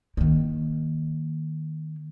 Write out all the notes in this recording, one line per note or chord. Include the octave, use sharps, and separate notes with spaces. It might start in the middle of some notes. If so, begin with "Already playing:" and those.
D#3 A#3